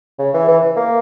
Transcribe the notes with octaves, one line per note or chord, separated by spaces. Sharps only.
C#3
E3
E3
A#3